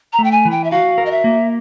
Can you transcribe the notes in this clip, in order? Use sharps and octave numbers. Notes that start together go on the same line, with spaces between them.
A#5
A3
G5
G#5
E3
G5
E5
F#4 F5
A#4
D#5
E5
A#3